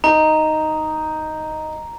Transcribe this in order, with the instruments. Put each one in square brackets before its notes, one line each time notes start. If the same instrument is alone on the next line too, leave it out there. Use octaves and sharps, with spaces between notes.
[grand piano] D#4 [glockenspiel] A#5